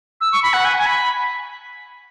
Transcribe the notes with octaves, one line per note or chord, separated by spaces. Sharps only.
E6
C#6
B5
F#5
G#5
G#5
B5